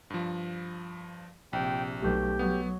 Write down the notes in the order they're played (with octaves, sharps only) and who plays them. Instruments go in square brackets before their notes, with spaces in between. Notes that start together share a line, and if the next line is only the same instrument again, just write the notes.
[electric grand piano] G2 F3
[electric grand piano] A#1 [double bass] C3 [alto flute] G5
[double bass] B1 A3 [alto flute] G4
[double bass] F#3 [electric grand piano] B3